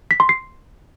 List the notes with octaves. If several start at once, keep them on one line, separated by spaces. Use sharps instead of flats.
B6
C6
C7